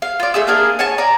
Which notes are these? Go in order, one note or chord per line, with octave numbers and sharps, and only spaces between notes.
F5
F4 D5
A3 G#4 E5 E6
A#3 D4 G#4 A#4
C#5 G#5 A5
C#5 D5 A#5